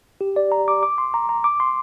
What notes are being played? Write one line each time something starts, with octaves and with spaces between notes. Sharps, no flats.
G4
D5
A#5
D6
D6
C6
A#5
A#5
D6
C6